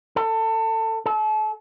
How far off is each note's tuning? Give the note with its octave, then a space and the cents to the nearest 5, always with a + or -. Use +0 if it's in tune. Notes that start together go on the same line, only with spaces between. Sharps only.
A4 +25
A4 -35